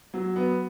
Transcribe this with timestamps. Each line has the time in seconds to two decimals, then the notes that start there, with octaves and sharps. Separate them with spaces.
0.14 F#3
0.36 B3